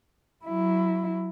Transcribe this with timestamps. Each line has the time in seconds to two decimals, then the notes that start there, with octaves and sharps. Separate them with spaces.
0.45 F#3 E4